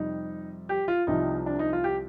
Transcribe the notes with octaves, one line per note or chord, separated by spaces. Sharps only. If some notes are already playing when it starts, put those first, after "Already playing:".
Already playing: F2 C3 G3 D#4
G4
F4
C2 C3 F3 D#4
D4
D#4
F4
G4